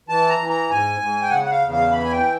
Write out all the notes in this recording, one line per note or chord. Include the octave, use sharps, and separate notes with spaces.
E3 A5
A#5
E3
A#5
G#2 G#5
G#2
G5
C#3 F#5
F#5
F5
E2
F5
E3 B5
G#5
G5